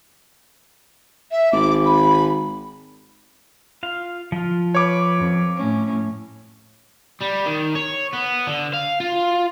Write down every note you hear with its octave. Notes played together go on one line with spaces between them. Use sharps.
E5
G#1 D6
B5
F4 F5
F3 F4
B4 C#5 D6
F2
A2 C#4
G3
D#3
C#5
B3
D3
F5
F4